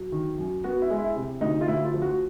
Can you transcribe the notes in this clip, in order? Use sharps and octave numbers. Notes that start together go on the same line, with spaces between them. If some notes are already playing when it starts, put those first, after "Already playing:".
Already playing: F#3
D#3
F#2
B3 F#4
E4
G#3
E4
C3
D2 D#4
F4
D2 E4
F4
F3
F#4